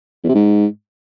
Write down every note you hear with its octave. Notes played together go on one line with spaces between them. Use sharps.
E2
C3
G#2